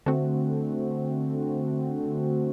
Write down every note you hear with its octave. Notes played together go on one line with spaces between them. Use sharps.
D3 A3 C4 F#4